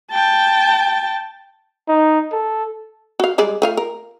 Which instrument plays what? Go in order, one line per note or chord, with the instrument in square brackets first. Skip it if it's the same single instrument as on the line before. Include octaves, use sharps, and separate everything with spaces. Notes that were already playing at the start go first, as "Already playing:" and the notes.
[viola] G5 A5
[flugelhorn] D#4
A4
[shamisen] F#4 F5
G3 G#3 D5
A3 F4 F5
A#4